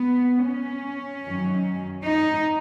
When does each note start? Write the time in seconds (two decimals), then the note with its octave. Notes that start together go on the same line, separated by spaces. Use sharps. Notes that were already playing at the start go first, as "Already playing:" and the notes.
Already playing: B3
0.46 C#4
1.25 F#2 D#3 F#3
2.04 D#4